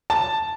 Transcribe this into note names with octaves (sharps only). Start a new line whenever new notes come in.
A5